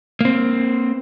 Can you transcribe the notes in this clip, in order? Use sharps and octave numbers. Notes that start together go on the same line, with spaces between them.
A#3 C4